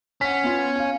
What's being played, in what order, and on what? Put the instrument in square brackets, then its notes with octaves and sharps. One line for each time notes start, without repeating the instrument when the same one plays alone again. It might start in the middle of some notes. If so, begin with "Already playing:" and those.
[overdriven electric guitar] C#4 [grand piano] F#5 B6
[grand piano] B3 F4
F5 G#5